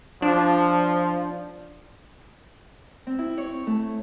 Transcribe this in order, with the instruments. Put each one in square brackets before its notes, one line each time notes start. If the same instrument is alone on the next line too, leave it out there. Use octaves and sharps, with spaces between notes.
[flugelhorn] F3 [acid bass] D4
[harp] C4
E4
C#5
A3